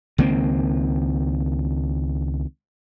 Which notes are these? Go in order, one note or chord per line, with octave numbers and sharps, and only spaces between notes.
C#2 D#3 A#3 C4